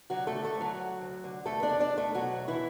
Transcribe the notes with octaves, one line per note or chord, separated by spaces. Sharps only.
D3 F#3 F#4
A3 A4
D3
A3 A4
D2
F#3 F#4
D2
D2
D3
E2 A3 A4
D4 D5
E2
D4 D5
E2
A3 A4
B2 F#3 F#4
E2
E3 E4